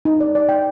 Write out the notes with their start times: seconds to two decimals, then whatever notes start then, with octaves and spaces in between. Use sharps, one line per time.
0.05 D#4
0.20 D5
0.35 D5
0.49 G5